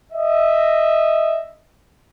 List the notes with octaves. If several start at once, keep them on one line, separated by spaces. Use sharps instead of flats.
D#5 E5